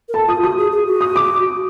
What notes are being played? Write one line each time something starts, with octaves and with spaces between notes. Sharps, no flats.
A#4
A4 A5
F4 D#6
F#4 D#6
G#4
G#4
F#4
D#6
D6